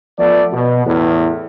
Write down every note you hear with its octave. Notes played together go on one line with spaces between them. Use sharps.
F3 A3 B3 D5
B2
E2 A2